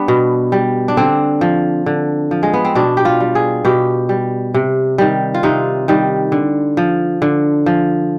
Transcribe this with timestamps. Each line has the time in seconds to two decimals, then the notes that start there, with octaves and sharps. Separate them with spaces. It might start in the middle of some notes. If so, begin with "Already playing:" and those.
Already playing: G3 B3 D4
0.08 B2
0.52 G3
0.88 D4
0.97 D3 C4
1.41 F3
1.86 D3
2.31 F3
2.43 G#3
2.54 B3
2.65 C4
2.75 B2 D4
2.97 G4
3.05 F4
3.20 G3
3.35 G#4
3.65 B2 G4
4.09 G3
4.54 C3
4.98 D#3 G3
5.34 F4
5.43 C3 D#4
5.88 D#3 G3
6.32 D3
6.77 F3
7.22 D3
7.66 F3